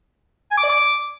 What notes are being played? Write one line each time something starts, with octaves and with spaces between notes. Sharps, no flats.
G#5
D6
D5
D6